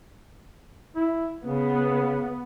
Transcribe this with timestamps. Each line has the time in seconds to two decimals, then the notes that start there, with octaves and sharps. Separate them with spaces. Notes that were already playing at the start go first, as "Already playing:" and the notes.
0.96 E4
1.45 C#3 B3